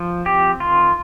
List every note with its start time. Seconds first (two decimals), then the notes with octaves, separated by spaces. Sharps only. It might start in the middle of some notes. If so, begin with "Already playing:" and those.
Already playing: F3
0.26 C4 G4
0.60 D#3 F4